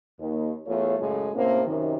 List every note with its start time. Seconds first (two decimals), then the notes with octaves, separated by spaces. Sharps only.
0.19 D#2
0.66 E2 A3 F4 C#5
0.98 F#2 A2 C#3 G#3 A3
1.34 A2 C3 A#3 C4 C#4
1.66 F#2 C3 D#3